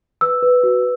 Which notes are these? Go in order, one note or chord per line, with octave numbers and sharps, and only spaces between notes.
B4 E6
B4
F#4